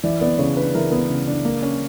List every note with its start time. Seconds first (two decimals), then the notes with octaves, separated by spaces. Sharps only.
0.03 E3 D5
0.21 B3 D5
0.38 C#3 C#5
0.56 D4 B4
0.74 E3 A#4
0.92 B3
1.10 C#3
1.27 D4
1.45 A#3
1.63 C#4